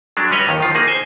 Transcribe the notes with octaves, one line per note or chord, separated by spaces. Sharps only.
F#3 G#3 D4
G3 C#4 B4 C#5 D#5
D#2 D#3
D#3 F3 F4
A#3 D#4 G#4
C5 G#5